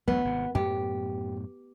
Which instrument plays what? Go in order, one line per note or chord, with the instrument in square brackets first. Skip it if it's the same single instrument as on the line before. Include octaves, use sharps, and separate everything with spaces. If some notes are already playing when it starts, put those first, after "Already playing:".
[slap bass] A1 D2 F#3 [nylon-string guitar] B3
[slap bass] G#1 C3
[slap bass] F#2 A2 B3 [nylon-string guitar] G4